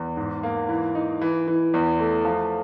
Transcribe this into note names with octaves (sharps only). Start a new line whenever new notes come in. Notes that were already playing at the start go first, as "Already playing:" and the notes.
Already playing: E2
G#2
A#3
E3
D#4
E3
E3
E2
A3
F3